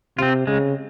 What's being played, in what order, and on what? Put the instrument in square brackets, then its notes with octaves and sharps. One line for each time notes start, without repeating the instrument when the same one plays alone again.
[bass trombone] C3 [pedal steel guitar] C4 F4
[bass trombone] C#3 [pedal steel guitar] G#3